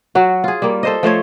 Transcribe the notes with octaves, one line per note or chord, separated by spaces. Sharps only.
F#3 F#4
F4 G#4
G3 A#3
A4 C5 D#5
F3 A3 C5 C#5